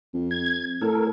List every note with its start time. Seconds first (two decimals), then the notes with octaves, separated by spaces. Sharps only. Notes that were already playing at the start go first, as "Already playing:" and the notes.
0.14 F2
0.31 G#6
0.81 A2 A4 A#4